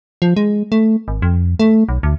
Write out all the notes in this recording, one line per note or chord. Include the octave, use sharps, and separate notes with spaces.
F3
G#3
A3
G#1
F2
A3
B1
D2